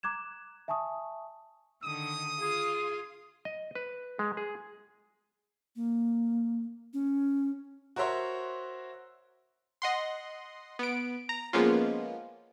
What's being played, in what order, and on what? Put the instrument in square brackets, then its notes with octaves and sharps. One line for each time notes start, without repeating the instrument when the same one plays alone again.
[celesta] A#5 D6 F#6 G#6 E7
E5 G#5 A5 C#6 D#6
[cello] D3 D#3 [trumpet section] D#6
[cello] F4 [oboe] G#4
[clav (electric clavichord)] D#5
B4
G#3
G#4
[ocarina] A#3
C#4
[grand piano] F#4 A#4 C5 C#5 E5 C6
[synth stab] D#5 F#5 C6
B3 D7
A#5
F3 G#3 A#3 B3 C#4 F4